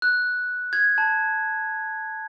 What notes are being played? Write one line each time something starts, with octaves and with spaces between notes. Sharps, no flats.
F#6
G#6
A5